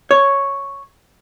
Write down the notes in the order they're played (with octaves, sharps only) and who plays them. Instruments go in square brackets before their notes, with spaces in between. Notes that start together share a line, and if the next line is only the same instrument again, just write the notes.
[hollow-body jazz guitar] C#5